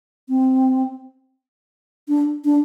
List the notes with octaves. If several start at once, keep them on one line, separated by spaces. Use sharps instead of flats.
C4
D4
D4